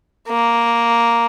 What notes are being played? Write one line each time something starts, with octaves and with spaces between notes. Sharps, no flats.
A#3